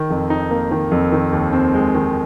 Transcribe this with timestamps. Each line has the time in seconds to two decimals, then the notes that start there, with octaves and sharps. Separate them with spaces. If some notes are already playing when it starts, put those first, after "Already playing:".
Already playing: D#3
0.10 F2
0.30 D#4
0.51 A#3
0.71 D#3
0.91 F2
1.12 D#3
1.33 D#2
1.53 C4
1.74 G#3
1.94 D#3